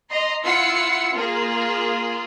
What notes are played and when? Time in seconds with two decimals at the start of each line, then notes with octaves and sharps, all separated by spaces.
0.10 D#5 A#5 C6
0.45 E4 F4 F#5 E6 C7 C#7
1.14 A#3 F4 G#4